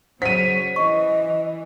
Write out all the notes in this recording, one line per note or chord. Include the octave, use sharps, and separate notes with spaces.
C#3 F#3 C5 C#5 F#5 B6 D#7
E3 D#5 C#6